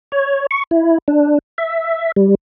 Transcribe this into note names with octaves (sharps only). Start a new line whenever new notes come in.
C#5
C#6
E4
D4
E5
G3